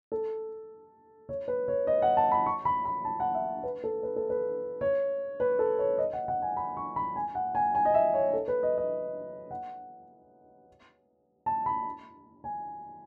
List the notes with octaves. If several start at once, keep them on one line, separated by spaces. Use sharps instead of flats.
A4
C#5
B4
C#5
D#5
F#5
A5
B5
C#6
B5
B5
A5
F#5
E5
B4
A4
B4
A4
B4
C#5
B4
A4
C#5
D#5
F#5
F#5
G#5
B5
C#6
B5
G#5
F#5
G#5
G#5
D#5
E5
C#5
A4
B4
D#5
D#5
F#5
A5
B5
G#5